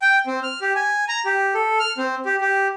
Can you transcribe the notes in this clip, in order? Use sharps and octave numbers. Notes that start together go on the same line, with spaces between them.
G5
C4
F6
G4
G#5
A#5
G4
A4
F6
C4
G4
G4